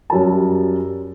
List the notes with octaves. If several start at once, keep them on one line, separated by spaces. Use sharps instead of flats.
F#2 G3 A#4 A5